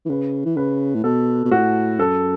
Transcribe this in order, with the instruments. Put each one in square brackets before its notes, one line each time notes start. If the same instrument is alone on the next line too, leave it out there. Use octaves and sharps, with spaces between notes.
[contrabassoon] E3
[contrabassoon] C#3 [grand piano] B4
[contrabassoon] E3
[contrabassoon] C#3 [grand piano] B4
[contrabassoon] A2
[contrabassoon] B2 [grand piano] A4
[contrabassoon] B2
[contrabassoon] A2 [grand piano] F#4
[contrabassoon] F#2 [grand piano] A4